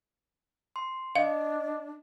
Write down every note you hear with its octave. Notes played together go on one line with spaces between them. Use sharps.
C6
D4 D#5 F5